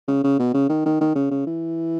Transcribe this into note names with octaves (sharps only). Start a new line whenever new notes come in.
C#3
C#3
B2
C#3
D#3
D#3
D#3
C#3
C#3
E3